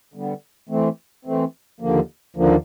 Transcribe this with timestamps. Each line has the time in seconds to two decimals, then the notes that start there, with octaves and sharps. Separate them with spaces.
0.14 D3 G3 B3
0.69 E3 A3 C4
1.25 E3 A3 C4
1.80 D#2 D3 F3 A#3
2.36 D#2 D3 F3 A#3